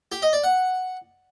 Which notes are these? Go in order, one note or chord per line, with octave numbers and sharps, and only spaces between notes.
G4
D#5
D5
F#5